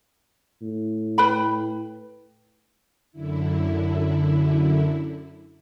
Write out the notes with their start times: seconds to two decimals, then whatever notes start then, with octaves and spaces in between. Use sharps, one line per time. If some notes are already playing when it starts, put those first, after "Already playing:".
0.62 A2
1.18 B4 G5 B5
3.12 F#2 D3 E4